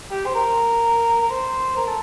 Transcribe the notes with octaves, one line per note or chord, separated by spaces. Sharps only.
G4
C5
A#4
A#4
C5
A#4
A4